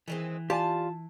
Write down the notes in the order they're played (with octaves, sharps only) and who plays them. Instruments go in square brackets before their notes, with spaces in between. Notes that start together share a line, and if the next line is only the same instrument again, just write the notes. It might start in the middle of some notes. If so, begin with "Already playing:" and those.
[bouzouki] D#3 G#3 C4 [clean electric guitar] E3
[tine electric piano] F4 [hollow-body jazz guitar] G4 D5 G#5 [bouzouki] A5